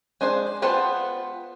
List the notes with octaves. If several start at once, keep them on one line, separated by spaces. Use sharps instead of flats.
G#3 D4 G#4 C5
B3 F4 C5 F#5 A5